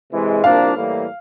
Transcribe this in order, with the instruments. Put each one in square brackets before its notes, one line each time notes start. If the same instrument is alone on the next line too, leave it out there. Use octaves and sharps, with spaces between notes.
[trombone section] C3 E3 G#3
[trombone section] C2 A#2 F3 A#3 D4 [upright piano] F5
[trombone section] A2 E3 G3 A#3